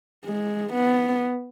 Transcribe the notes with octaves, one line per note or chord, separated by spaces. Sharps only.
G#3
B3